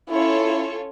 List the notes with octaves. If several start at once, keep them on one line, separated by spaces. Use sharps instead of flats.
C#4 E4 F4 A4 C#5